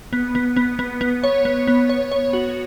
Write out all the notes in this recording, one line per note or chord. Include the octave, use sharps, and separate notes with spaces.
B3
B3
B3
B3
B3
C#5
B3
B3
C#5
C#5
F#4